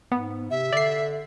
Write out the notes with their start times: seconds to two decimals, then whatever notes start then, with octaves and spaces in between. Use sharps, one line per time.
0.12 G#2 B3
0.51 C3 E5
0.73 D3 D5 C7